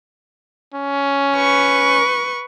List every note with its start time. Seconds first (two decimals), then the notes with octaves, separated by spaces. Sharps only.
0.74 C#4
1.37 B4 C#6